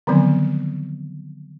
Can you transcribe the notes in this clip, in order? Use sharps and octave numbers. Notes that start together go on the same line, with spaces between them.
D3 D#3 F3 F#3 B3 C4